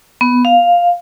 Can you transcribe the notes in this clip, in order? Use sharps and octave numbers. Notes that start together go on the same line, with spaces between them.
B3
F5